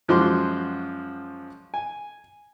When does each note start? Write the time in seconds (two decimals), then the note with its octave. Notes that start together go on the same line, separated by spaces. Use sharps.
0.08 F#2 F3 G#3 F#4 C6 D6
1.74 G#5